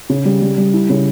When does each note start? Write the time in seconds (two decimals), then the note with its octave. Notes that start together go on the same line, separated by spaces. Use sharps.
0.09 C#3
0.25 G3
0.42 G3
0.58 G3
0.73 E4
0.89 C#3